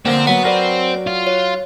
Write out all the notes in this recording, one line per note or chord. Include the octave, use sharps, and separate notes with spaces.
D3 F3 A#3 C4 A#4
F#3 B3 F#5
C4 A#4 B4 D5
F4
C#5